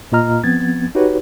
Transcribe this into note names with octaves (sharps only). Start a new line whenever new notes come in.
A#2 A#3 F4 D#5 A#5 F6
F3 B3 C4 G#6 A6
D#4 F#4 G4 B4 C#5